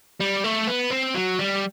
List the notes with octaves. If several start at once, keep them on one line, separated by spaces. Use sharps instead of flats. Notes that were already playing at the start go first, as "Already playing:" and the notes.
G3
A3
B3
C4
F#3
G3